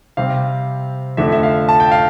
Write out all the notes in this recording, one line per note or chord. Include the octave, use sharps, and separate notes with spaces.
C3 G3 C4 F5
F2 D3 A3 D4 E5
E5
F5
A5
G5
F5